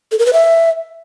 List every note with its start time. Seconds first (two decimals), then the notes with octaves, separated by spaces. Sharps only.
0.12 A4
0.19 A#4
0.26 B4
0.33 E5